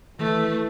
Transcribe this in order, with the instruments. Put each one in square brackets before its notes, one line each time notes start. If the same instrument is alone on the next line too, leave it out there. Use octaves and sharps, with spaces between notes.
[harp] E3 [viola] A3